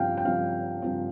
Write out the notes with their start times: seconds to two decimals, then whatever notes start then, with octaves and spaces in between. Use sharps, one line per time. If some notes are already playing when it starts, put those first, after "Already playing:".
Already playing: G2 F3 C4 F5 G5
0.17 G5
0.25 G2 F3 C4 F5
0.82 G2 F3 C4